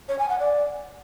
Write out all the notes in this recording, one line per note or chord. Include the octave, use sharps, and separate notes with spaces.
C#5
G#5
F#5
D5